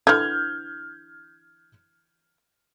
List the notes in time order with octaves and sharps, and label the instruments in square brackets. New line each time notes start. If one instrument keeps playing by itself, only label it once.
[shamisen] D3 E3 [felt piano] F6 G6 G#6